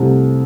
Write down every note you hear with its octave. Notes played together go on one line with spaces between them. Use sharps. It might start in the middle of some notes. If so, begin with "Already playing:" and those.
Already playing: C2 C3 A3